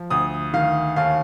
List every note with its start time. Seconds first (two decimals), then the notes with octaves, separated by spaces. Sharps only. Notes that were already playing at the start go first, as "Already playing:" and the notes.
Already playing: F3
0.10 D2 D#6
0.54 D#3 F5
0.96 D#2 F5